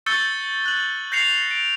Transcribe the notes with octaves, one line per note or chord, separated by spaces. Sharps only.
C#6 E6 G6 A6 C#7 G7
F#6 F#7
G6 A#6 C7 C#7 F7
D7